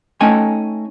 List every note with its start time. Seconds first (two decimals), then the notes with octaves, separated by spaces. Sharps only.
0.21 A3 C#4 D#4 A4 G5 G#5